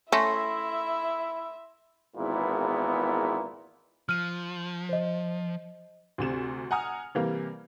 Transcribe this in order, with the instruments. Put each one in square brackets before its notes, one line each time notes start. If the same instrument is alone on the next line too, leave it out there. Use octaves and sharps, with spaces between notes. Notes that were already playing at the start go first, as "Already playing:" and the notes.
[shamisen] A3 C#4 [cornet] E4 [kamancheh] E5 [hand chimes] C6 A#6
[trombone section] G#1 E2 A#2 B3 E4
[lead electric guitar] F3 [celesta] F6 D#7
[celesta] C5 D#5
[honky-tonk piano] D2 C3 E7
F#5 G#5 A#5 D#6 F6
C3 E3 G3 A#3